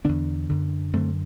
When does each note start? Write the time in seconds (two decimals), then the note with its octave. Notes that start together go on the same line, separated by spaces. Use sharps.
0.04 E2 D3 B3 D4
0.49 F#2 D3
0.93 F#2 D3 A3 C4